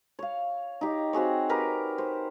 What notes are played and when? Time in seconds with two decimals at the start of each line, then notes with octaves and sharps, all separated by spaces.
0.19 C#5 F5
0.81 D#4 G4
1.13 C4 F#4 G#4 C#5
1.49 G4 A#4 B4
1.98 C5